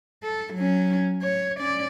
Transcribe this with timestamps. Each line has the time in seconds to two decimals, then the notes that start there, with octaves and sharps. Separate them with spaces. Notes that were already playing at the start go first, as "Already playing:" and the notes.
0.24 A4
0.54 F#3 C#4
1.22 C#5
1.58 C#4 D5